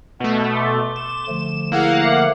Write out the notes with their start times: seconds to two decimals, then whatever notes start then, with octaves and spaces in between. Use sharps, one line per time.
0.20 B2 A3 B3
0.56 C6 D6
0.96 E7
1.28 D3 F3 A3
1.72 A#3 E4 G#4 F5 F#5
2.03 A#4 E5 D6